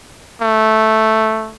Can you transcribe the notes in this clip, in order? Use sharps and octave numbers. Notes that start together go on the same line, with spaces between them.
A3